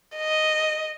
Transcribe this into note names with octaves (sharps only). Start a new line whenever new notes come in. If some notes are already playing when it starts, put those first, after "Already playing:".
D#5